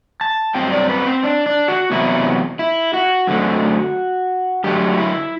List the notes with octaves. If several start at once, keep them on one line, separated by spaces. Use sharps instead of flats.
A5
G2 F#3 C4 G5
D5
B4
C4
D4
D4
F#4
E2 C3 F#3 B3 E4
E4
F#4
F#2 D3 A3 C4
F#2 D3 F#3 A3 G4
F#4
E4